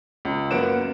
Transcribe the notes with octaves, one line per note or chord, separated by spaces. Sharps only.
C#2
F#2 A#3 B3 F#5 D7 E7